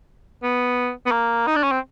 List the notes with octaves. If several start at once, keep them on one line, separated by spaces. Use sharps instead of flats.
B3
B3
A#3
D#4
D4
C#4
C4